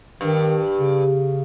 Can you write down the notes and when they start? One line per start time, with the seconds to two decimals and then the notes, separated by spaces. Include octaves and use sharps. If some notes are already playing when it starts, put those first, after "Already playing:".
0.21 G2 D#3
0.80 C#3